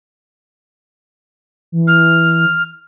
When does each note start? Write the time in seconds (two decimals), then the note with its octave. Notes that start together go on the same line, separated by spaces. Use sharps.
1.72 E3
1.87 F6